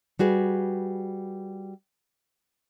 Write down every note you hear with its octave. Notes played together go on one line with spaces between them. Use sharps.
G3 F#4 G#4 B4